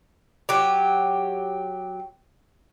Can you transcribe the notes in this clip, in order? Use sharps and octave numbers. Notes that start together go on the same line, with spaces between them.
F#3 G4